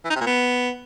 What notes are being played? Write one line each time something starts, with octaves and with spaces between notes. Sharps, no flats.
E3
D#4
C3
A#2
B3